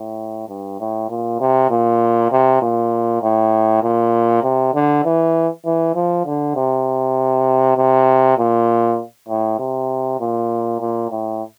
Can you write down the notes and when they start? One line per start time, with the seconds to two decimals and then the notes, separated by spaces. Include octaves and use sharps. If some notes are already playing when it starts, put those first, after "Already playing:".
Already playing: A2
0.49 G2
0.80 A2
1.09 A#2
1.40 C3
1.70 A#2
2.31 C3
2.62 A#2
3.22 A2
3.83 A#2
4.43 C3
4.74 D3
5.05 E3
5.65 E3
5.95 F3
6.26 D3
6.55 C3
7.77 C3
8.38 A#2
9.28 A2
9.59 C3
10.20 A#2
10.81 A#2
11.11 A2